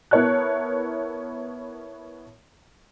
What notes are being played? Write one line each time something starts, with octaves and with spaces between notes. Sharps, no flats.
B3 E4 A#4 C#5 A5 F#6